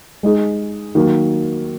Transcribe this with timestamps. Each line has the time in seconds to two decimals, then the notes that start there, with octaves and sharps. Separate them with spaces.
0.23 G#3 D#4 G#4
0.95 D#3 F#3 A#3